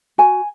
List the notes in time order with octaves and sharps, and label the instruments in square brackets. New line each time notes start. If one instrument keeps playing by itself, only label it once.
[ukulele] F#4 G#5